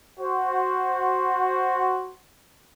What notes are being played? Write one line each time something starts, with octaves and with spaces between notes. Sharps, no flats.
F#4 C5